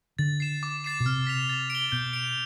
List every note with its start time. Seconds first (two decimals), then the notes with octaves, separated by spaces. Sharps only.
0.19 D3 A6
0.40 C7 E7
0.63 D6
0.84 A6 C7 E7
1.00 B2
1.05 C3 F6
1.27 B6 F7
1.49 A6
1.70 D7 G7
1.92 B2 G6
2.13 D7 F7